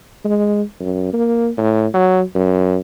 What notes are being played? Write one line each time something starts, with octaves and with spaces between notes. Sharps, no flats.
G#3
F#2
A#3
A2
F#3
F#2